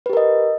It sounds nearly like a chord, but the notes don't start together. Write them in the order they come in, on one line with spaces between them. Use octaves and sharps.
B4 G4 A#4 D#5